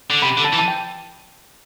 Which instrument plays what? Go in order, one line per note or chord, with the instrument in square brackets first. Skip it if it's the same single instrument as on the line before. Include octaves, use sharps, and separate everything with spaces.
[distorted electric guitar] D3
[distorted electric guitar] C3 [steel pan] B5
[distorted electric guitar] D3
[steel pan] A5
[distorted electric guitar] E3
[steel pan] A5
G5